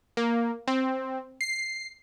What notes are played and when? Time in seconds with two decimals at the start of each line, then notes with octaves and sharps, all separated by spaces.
0.17 A#3
0.67 C4
1.41 C7